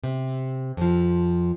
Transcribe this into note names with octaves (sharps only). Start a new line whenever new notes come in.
C3
F2 F3